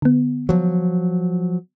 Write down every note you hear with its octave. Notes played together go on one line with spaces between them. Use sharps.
D3 B3
F3 F#3